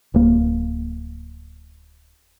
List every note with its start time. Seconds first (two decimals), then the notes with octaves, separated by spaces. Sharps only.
0.14 D1 A#3